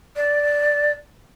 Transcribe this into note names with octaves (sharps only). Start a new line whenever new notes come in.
D5